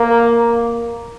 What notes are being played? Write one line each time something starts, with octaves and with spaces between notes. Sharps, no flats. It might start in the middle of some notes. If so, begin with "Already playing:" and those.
Already playing: A#3